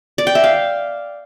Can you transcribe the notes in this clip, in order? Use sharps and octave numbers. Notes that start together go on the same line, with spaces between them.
D5
G5
E5
F5